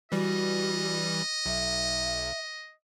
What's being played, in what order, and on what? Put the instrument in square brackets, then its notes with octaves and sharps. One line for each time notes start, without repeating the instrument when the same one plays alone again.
[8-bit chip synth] E3 G3 [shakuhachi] F#4 [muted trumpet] D#5
[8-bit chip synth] B1 [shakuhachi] E5